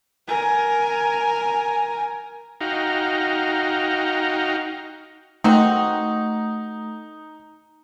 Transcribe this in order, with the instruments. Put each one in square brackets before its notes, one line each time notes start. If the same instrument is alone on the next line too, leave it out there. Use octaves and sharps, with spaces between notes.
[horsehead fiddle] A#4 G#5
[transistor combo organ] D#4 F#4 F5 G5 A#5
[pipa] D#3 C4 F#4 [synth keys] A3 [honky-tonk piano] D#4